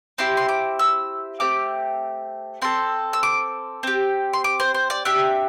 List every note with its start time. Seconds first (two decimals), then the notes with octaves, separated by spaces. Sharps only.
0.18 C4 E4 G4 C6
0.37 C6
0.49 D6
0.79 E6
1.40 A3 C4 G4 D6
2.62 C4 A4 C6
3.13 E6
3.23 D6
3.83 C4 G4
4.33 C6
4.44 D6
4.60 C5
4.75 C5
4.90 D5
5.05 D4 G4 E5